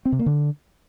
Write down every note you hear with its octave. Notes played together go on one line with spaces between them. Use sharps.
C4
C3
A#3
D3